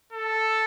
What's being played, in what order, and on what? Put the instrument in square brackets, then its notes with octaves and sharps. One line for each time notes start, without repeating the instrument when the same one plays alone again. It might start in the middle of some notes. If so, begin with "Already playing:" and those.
[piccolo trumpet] A4